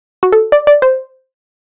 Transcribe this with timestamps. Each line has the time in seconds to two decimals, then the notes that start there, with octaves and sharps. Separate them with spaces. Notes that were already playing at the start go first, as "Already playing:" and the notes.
0.23 F#4
0.32 A4
0.52 D5
0.67 D5
0.82 C5